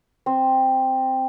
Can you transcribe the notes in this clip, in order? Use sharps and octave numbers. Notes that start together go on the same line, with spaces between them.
C4